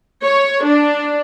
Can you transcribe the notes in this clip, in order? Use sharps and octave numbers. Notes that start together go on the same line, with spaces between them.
C#5
D4